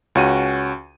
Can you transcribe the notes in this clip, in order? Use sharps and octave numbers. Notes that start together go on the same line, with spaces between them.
C#2 C#4 F#4 D#7